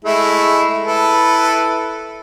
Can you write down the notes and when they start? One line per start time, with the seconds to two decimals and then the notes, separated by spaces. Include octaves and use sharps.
0.04 G#3 A3 E4
0.86 E4 A4 B4